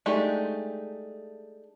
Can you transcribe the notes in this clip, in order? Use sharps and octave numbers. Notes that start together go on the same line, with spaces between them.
G#3 A3 D4 D#4 G4